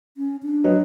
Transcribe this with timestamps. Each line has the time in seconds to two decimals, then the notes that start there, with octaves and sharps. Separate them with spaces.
0.17 C#4
0.43 D4
0.64 F#3 B4 D#5